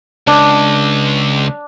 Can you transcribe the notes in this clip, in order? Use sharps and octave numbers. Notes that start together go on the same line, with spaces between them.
C#2 D4